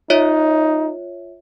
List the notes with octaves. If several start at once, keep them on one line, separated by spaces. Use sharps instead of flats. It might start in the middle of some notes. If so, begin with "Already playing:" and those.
D#4 F4 C#5 E5